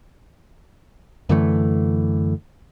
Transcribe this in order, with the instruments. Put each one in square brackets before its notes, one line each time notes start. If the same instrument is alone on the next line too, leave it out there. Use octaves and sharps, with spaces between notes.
[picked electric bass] F#2 D3 E3 A3